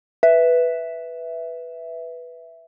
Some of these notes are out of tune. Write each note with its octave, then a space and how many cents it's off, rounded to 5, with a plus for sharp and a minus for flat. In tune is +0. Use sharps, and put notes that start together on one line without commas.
B4 +0 E5 +0